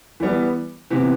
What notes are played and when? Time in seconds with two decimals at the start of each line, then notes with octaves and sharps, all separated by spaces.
0.20 E3 G3 B3
0.91 C3 E3 B3